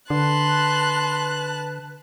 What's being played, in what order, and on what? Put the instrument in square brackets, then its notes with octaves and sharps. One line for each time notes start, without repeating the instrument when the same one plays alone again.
[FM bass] D3 [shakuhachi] B4 [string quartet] A5 F#6 [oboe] C6